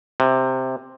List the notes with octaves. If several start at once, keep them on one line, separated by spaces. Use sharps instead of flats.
C3